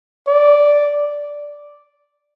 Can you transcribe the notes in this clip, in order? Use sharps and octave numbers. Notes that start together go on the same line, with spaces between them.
D5